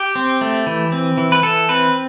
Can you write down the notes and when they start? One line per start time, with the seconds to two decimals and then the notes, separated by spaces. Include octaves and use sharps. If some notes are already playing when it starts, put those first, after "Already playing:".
Already playing: G4
0.15 C4
0.41 A3
0.67 E3
0.92 C4
1.18 E3
1.32 B4
1.43 E3 A4
1.69 C4 B4